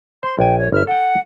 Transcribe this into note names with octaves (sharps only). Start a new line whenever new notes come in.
C5 C6
A#1 G5 G#5
C#5
G1 E5 F6
A4 F#5 G5